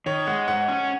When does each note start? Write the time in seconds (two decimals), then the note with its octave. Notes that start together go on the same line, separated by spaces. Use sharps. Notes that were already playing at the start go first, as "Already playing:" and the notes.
0.06 D#3 C#5
0.27 G#3 F#5
0.48 G#2 F#5
0.68 C#4